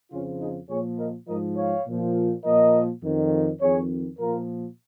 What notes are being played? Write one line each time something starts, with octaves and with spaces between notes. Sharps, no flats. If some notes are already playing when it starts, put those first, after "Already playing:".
F2 C#3 F3 C#4 F4
D#4 G#4
A#2 F3 G#4 C#5
A#4 D#5
G#2 F3 A#4 D#5
C#5 F5
A#2 F3
A#2 F3 A#4 D#5
F2 D#3
F2 D#3 G#4 C#5
A#2 F3 F4 A#4